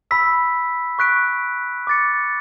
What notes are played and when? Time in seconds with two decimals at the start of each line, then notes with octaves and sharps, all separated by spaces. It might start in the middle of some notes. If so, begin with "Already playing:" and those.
0.11 B5 E6 B6
0.99 C#6 F#6 B6 D7
1.87 D6 A6 C#7